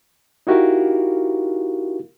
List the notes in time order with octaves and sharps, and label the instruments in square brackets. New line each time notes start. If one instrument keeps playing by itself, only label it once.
[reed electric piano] D#4 E4 F#4 G4 A#4 F5